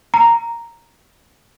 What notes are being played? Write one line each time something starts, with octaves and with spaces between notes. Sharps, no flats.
A#5